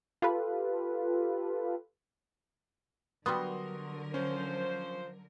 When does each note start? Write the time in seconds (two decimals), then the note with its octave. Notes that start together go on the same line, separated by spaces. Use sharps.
0.22 F4 G4 A4 B4
3.26 D3 F#3 G3 B3 F#4 A#4 C6 D#6
4.14 F3 C#4 C5